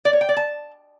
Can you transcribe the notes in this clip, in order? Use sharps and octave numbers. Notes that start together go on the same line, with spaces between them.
D5
C#5
G5
D5
A5